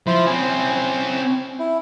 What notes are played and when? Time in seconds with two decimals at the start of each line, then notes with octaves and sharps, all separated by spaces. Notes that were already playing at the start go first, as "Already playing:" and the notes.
0.07 F3 E4 C5 B5
0.26 C4 C#4 E4
1.59 E4